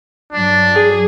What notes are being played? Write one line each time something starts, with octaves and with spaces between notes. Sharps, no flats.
G2 F#3 D4
G#4